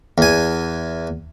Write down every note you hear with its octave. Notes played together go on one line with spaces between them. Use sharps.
E2 G#5